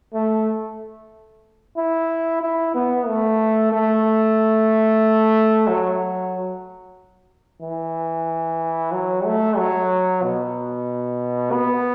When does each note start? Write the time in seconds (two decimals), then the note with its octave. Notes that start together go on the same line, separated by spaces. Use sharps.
0.14 A3
1.77 E4
2.41 E4
2.75 B3
3.07 A3
3.72 A3
5.67 F#3
7.62 E3
8.92 F#3
9.25 A3
9.57 F#3
10.23 B2
11.52 B3